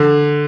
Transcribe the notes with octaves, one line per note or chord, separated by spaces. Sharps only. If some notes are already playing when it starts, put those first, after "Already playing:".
Already playing: D3